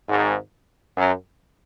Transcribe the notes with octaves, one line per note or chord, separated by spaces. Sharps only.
G#1 G#2
F#2